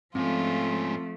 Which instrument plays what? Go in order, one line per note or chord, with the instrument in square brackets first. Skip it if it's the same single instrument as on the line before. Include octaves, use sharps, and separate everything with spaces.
[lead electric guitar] G#2 C#4 [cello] F3 A3 [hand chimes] C4 F5 [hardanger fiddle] F4